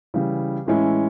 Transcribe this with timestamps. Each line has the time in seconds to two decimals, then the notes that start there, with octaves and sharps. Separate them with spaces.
0.14 C#3 E3 G3
0.66 A2 E3 G#3 C#4 E4